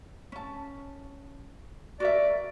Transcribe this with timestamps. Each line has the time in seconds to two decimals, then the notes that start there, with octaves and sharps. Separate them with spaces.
0.32 C#4 A5
2.00 F#4 A#4 D5 E5